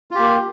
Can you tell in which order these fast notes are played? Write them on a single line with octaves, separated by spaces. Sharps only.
F4 G4 A#3